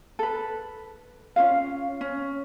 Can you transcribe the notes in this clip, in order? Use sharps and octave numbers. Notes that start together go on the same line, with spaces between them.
A4 B4
C#4 D4 F4 F5
C#4